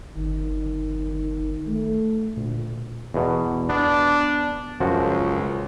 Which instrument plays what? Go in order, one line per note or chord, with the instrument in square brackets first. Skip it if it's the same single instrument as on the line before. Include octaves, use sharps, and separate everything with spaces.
[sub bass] G1 [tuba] D#3
[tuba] A3
[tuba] D2 [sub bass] A#2
[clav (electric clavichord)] E2 B2
[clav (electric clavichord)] B3 [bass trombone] D4
[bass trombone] C#2 [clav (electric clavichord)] F#2 F3 F#4